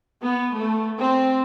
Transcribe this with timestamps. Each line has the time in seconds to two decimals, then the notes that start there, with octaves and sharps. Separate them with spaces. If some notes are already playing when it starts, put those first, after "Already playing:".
0.21 B3
0.56 A3
0.98 C4